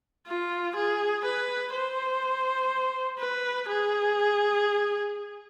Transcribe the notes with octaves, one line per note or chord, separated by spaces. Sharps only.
F4
G#4
B4
C5
B4
G#4